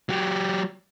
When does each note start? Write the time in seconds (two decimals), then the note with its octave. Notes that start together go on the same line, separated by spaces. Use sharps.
0.09 F#3 G4